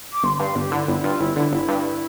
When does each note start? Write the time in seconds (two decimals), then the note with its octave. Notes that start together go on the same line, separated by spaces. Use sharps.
0.12 D6
0.23 G1 C6
0.39 G2 F5
0.55 G1 G4
0.71 D3 E4
0.87 G1 E4
0.99 E4
1.04 G2 F4
1.19 G1 E4
1.36 D3 E4
1.52 G1 E4
1.68 G2